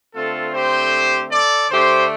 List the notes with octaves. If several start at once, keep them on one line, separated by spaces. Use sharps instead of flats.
D3 A3 C4 F4 A4
G4 C5
A4 D5
D3 A3 D4 G4 C5